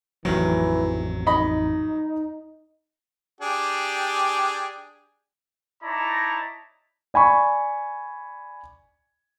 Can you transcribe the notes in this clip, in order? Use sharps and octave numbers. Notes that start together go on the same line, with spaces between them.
A1 F2 D#3 E3 F#3
D#4 D#5 B5
D4 G4 G#4
D#4 E4 C#5 D5 A5 A#5
D5 G#5 B5 C#6